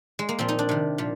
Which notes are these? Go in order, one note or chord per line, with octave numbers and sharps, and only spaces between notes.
G#3
A#3
A#2 F3 C4
D#4
D4
C3 D#3
A#2 F3